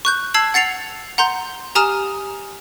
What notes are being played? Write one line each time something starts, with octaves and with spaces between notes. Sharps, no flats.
C#6 F#6 G6
A5 E6 G#6 C7 F#7
F#5 A6 C7 C#7 F7
F#5 A#5 C6 G6
G4 G#5 A#5 D#6 F6 E7